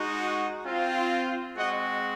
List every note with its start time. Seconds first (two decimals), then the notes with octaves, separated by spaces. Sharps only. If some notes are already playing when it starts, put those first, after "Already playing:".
Already playing: G#3 D#4 F#4
0.67 C4 F4
1.57 G#3 C4 F#4 D#5 F#5